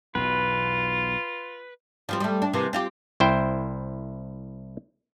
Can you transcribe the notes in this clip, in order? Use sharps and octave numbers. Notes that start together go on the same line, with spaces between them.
B1 E2 B2 F4 B4
F3 G3 C4
G3 A3
D4
C3 E3 A#3
C4 F4 G4
C2 E4 C5 G5